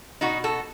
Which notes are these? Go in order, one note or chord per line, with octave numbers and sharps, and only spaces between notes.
B2 D#4 F#4
F#4 A4